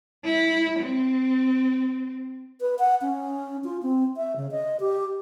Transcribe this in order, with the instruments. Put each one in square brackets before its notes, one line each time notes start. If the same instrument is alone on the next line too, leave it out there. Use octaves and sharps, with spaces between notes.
[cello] E4
C4
[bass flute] B4
F#5
C#4
F4
C4
E5
C#3
D#5
G4